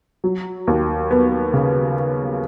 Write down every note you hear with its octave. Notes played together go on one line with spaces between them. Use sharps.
F#3
D#2
B3
C#3